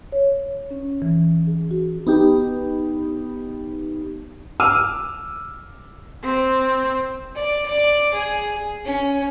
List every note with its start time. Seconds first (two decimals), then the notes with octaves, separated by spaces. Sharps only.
0.12 C#5
0.71 C#4
1.02 E3
1.47 G#4
1.71 F#4
2.07 B3 D#4 G4
4.60 D6 E6 F6 D#7
6.23 C4
7.36 D5
7.66 D5
8.14 G#4
8.85 C#4